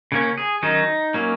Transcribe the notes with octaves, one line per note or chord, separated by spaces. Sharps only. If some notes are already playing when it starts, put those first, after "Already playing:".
C#3 A#3 C#4
G#4
D#3 F#3 C#4 D#4
F#3 A#3 C#4